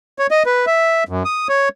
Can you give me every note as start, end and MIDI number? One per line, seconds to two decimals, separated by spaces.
0.19 0.27 73
0.31 0.43 75
0.46 0.65 71
0.67 1.04 76
1.09 1.23 42
1.25 1.48 87
1.49 1.69 73